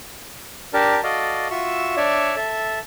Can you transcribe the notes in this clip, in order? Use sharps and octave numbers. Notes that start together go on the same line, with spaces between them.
D4 G4 A#4 A5
F#4 A4 D5 D#5 F5
F4 F#4 E5 C#6 E6
D4 C#5 D5 E5
A4 E5